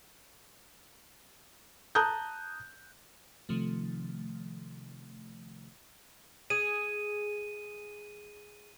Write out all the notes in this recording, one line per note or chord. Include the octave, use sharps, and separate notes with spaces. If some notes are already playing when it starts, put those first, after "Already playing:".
A5 A#5 D#6 F#6 G6
C3 D#3 F3 A3
G#4 D#7